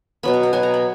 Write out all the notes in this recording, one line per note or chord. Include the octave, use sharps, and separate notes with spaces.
B2 F#3 B3 B5
A#5
F#5
B2 F#3 B3 G#5
A#5
B5